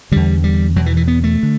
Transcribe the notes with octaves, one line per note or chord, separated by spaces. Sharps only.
E2 D3 G3
G3
E2 B2 F#3
E3
E3
B3
A3
D3